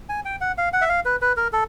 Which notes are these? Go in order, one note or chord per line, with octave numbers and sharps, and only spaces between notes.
G#5
G5
F#5
F5
F#5
E5
F5
B4
B4
A#4
A4